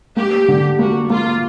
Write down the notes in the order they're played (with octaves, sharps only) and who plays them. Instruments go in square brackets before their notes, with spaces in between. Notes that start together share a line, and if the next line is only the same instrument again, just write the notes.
[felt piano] A#3 [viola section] G4
[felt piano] D3
[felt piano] A#3 [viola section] F#4
[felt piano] A#3 [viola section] F4